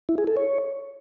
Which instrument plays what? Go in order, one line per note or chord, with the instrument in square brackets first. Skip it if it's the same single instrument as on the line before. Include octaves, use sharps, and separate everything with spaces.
[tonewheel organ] E4
G#4
A4
C#5